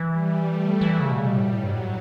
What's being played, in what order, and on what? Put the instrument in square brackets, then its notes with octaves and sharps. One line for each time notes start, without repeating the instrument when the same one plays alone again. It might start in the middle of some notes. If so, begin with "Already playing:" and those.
Already playing: [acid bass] E3
[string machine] G3
A3
[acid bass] E3
C#3
B2
[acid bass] C#3 [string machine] G3
[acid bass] B2
A2
B2
[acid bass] A2 [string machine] F#3
[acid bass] G2
A2